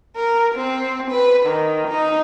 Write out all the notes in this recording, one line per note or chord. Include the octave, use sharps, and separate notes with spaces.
A#4
C4
B4
D#3
D#4